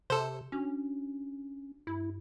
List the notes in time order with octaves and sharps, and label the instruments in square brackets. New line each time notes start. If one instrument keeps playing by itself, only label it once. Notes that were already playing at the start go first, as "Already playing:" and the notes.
[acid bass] C3 [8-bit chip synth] A4 C5
[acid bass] C#4 [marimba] D4 F#4
[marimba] G2 [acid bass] E4